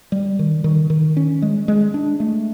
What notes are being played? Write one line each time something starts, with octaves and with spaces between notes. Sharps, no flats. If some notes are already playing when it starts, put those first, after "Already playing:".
G3
D#3
D#3
D#3
C#4
G#3
G#3
D4
A3